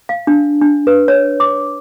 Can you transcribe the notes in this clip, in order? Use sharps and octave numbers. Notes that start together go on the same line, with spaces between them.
F5
D4
D4
B4
C#5
D6